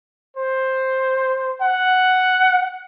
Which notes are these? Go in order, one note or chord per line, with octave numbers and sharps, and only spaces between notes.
C5
F#5